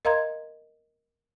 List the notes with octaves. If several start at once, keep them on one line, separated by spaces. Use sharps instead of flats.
A#4 D#5 F5 A#5 C6 G#6